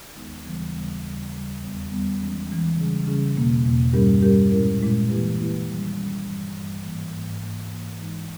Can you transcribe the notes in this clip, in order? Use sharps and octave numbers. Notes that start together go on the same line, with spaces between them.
D#2 D#3 G#3 B3 D#4
D#2 C#3 E3 G3 B3
D#2 C#3 E3 G3 B3
D#2 C#3 G3
D#2 C#3 G3
E2 D#3 G3 B3
E2 D#3 G3 B3
E3 G#3 C#4
E3 G#3 C#4
C#3 G3 C#4 G#4
C#3 G3 C#4 G#4
E2 B2 A#3
E2 B2 A#3
G2 G3 C#4 G4 A#4
G2 G3 C#4 G4 A#4
A#2 G#3 C#4 E4 A#4
A#2 G#3 C#4 E4 A#4
E3 A#3 E4 G4 B4
E3 A#3 E4 G4 B4
D#3 G3 C#4
D#3 G3 C#4
G2 E3 G3
G2 E3 G3
G#2 E3 A#3
G#2 E3 A#3
G#2 E3 A#3
G#2 E3 A#3
E3 G#3 D#4